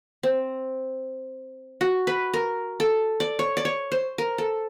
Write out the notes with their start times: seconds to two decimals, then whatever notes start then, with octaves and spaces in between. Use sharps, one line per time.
0.23 C4
1.81 F#4
2.07 B4
2.34 A#4
2.80 A4
3.20 D5
3.39 C#5
3.57 D5
3.65 C#5
3.92 C5
4.18 A#4
4.38 A4